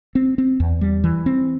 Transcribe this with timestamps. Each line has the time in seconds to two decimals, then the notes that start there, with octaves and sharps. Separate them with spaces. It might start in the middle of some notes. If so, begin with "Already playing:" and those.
0.15 C4
0.38 C4
0.60 E2
0.81 G3
1.04 E3
1.26 C4